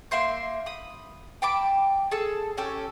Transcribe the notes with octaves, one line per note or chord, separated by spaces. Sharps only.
A#3 E5 C6 G6
B5 D#6
G5 A5 B5 D6
G#4 A4 A5 E6
C#4 G4 A4